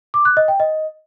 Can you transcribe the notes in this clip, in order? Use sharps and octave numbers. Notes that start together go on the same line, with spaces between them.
D6
F#6
D#5
G5
D#5